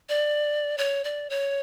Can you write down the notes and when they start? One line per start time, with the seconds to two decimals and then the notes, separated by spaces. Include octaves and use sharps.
0.09 D5
0.78 C#5
1.04 D5
1.30 C#5